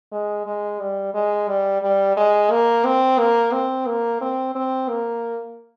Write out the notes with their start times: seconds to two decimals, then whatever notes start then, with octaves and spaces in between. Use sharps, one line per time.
0.12 G#3
0.46 G#3
0.80 G3
1.14 G#3
1.48 G3
1.82 G3
2.17 G#3
2.51 A#3
2.85 C4
3.19 A#3
3.53 C4
3.87 A#3
4.21 C4
4.55 C4
4.89 A#3